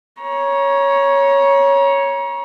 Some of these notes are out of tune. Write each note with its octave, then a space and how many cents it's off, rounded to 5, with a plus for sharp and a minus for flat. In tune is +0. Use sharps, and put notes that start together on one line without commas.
C#5 +0 A#5 +35